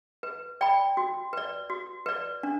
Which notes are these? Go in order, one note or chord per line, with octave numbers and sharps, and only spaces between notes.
B4
D5 G5 B5
F#4
B4 D5
F#4
B4 D5
D4